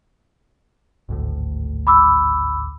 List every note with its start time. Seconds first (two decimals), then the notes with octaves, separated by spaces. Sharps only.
1.09 G#1 D2 A2
1.87 B5 D6 E6